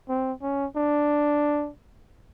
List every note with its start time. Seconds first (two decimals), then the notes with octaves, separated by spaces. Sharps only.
0.09 C4
0.42 C#4
0.76 D4